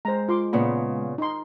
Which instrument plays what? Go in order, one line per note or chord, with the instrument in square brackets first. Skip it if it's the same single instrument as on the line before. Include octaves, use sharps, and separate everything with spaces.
[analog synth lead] G#3 [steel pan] C5 A#5
[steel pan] F4 C6 D6
[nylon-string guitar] A#2 C#3 B3 [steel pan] B5
[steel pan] D#4 C6